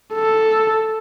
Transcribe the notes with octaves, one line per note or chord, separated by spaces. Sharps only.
A4